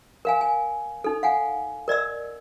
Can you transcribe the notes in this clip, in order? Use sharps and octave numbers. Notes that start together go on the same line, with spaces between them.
A#4 F5 G#5
G#5
D#4 A4
F5 F#5 G#5
A#4 D5 D#5 E6